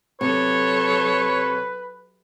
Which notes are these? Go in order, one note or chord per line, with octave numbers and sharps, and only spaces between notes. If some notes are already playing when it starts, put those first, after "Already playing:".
C3 F#3 A4 B4 C#5